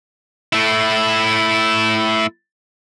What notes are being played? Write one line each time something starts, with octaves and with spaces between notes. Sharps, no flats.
A3 E4